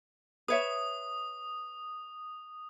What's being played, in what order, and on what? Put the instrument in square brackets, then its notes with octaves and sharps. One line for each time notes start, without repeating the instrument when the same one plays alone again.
[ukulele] B4 C#5 E5 [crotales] D#6